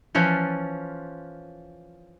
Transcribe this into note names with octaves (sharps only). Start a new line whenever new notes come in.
E3 F3 C#4 F4